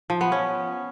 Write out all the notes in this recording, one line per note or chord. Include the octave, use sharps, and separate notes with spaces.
F3
B3
C#4